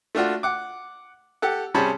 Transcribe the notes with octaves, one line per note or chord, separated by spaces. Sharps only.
A3 D4 F4 F#4
F#5 D6
G4 A4 F#5
C3 G3 C#4 G#4 A5 B5